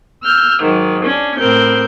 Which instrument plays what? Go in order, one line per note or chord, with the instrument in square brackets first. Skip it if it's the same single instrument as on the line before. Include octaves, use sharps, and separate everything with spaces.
[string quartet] E6 F6 G6
G#2 D#3 F#3
C#4 D4
A2 C4 A#4 G6